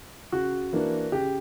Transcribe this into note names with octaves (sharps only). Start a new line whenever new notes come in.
C#3 F#4
E3 A#3 D4
C#3 G4